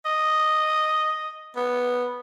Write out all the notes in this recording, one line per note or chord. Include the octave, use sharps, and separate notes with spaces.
D#5
B3